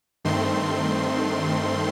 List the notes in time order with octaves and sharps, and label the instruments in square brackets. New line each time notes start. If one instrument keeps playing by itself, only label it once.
[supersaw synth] G2 D#3 A3 C4 C6